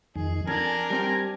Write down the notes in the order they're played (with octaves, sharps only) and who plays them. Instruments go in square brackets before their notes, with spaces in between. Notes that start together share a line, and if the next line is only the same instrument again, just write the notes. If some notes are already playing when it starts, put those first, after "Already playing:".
[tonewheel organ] F2 D#3 [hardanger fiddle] G#4
[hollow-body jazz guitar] F2 [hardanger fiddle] D4 [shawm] A#4 [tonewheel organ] G#5
[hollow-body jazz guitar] G3 C4 G4